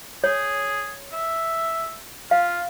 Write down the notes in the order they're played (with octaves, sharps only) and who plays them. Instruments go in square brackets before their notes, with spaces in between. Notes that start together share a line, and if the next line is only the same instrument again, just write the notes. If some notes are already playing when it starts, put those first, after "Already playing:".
[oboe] G#4 [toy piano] C#5
[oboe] E5
[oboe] F4 [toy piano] F5